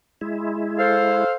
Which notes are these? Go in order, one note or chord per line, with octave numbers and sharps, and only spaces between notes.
G#3 E4
A4 C5 F5